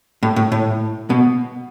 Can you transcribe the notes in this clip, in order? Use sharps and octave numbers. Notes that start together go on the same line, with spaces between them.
A2
A2
A2
B2